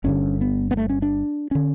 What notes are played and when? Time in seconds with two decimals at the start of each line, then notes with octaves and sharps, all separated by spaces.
0.04 G1 G2 D3 C#4
0.41 B3
0.71 B3
0.77 A3
0.90 C#4
1.02 D4
1.51 D3 C#4